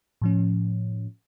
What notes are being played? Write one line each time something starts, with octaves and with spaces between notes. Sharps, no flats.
A2 F3 C#4